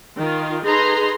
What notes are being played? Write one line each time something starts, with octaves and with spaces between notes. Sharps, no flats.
D#3 F4
D#4 G#4 A4 B4 A#5 C6